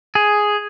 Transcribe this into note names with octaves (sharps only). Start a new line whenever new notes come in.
G#4